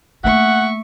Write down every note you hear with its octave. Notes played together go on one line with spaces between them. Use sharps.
A3 A#3 E5 F#5 C#6